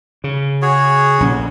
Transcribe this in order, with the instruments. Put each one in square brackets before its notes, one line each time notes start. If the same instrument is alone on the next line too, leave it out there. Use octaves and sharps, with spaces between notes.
[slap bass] C#3
[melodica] F#4 G#4 C#5
[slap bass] A#1 C#4